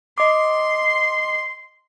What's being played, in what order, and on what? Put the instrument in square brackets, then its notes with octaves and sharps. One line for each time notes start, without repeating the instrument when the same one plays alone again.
[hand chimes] D#5 D6 [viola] C6